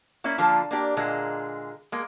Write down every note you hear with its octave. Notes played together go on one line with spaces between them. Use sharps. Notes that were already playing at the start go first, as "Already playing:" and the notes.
A#3 C#4 E4
D3 F3 A#3 F4 A4
A#3 D4 G4
A#2 D3 G#3 A#3
G#3 A#3